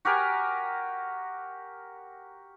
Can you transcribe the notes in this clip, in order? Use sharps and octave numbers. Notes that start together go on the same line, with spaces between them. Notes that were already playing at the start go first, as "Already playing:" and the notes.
F#4 G4 A#4 G#5